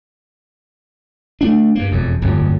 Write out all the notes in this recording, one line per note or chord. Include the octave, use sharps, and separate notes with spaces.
A3 D4
G2 A#3
E1 F2
D1 G1 F2